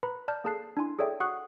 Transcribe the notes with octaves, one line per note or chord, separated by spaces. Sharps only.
B4 A#5 B5
D5 A5 F6 G6
A#3 G#4 A4 A5 F#6 C7
D4 E4 G#5 C6
G#4 A4 C#5 D5 E5 G5
F#4 F#5 C#6 D#6 F#6 C7